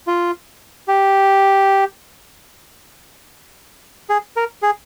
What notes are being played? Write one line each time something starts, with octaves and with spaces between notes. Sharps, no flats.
F4
G4
G#4
A#4
G#4